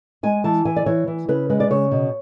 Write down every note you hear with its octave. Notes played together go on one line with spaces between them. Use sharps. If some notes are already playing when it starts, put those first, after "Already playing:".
G#3 G#5
E3 A5
E3 G#5
D5
E3 C#5
E3
C#3 B4
G#3 B4
D5
C#3 C#5
B2